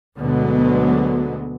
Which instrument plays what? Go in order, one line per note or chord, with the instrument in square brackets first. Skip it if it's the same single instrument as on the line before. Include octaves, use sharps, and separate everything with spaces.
[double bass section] D2 B2 D3 F#3 G#3 B3